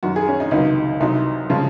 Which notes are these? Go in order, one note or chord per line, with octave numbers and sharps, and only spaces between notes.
F#2 D#3 F#3 F#4
G#4
C#4
D#4
C#2 C3 D#3 F#3 D#4
C2 C3 F#3 D#4
C#3 F3 G#3